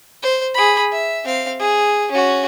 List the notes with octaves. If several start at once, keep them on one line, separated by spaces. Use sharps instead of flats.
C5
G#4 B5
E5
C4 F5
G#4
C#4 F#4